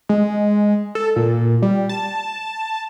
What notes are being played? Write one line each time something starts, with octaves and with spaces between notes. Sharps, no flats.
G#3
A4
A#2
G3
A5